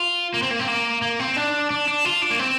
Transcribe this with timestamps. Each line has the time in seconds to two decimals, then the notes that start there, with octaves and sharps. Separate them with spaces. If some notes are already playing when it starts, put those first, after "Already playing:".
Already playing: F4
0.34 A#3
0.42 C4
0.51 A#3
0.60 C4
0.68 A#3
1.02 A#3
1.20 C4
1.36 D4
1.70 D4
1.88 D4
2.05 F4
2.22 D4
2.31 A#3
2.39 C4